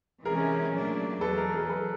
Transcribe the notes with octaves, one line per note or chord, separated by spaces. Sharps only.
C3 E3 G#3 C#4 G#4 A#4
A#2 F#3 A3 D4
E2 B2 F#3 A4 B4
G#4 A#4
G#4 A#4
A4 B4